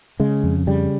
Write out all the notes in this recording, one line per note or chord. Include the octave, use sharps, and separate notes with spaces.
C#3 G#3
F2
C#3 G3